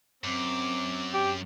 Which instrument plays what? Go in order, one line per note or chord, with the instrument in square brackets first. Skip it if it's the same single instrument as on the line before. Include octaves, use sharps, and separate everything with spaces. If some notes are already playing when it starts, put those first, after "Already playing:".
[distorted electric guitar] F#2 [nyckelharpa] C4 D6
[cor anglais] G4